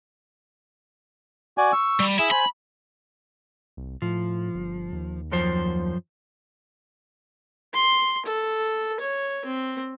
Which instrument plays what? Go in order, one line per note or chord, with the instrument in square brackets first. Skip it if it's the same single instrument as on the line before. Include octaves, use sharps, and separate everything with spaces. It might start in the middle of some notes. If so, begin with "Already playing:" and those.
[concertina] F#4 D5 G#5
C#6 E6
[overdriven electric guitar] G3
[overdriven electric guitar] E4 [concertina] G#4 E5
[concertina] C5 G#5 [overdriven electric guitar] B5
[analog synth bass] C2
[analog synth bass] A2 [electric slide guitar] F3
[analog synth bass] G1
D#2
[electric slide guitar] F#2 F3 C5
[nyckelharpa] C6
A4
C#5
C4